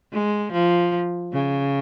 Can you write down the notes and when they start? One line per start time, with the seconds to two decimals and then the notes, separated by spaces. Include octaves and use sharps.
0.12 G#3
0.52 F3
1.33 C#3